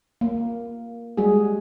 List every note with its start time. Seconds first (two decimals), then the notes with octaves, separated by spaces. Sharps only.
0.21 A#3
1.17 G3 G#3 F#4 G#4